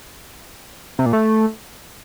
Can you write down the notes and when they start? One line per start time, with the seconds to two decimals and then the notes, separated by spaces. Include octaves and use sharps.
0.99 C3
1.06 A#2
1.13 A3